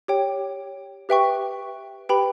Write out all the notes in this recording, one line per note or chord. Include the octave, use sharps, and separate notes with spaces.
G4 C#5 G5
G4 B4 E5 G5 C#6
G4 B4 G5 B5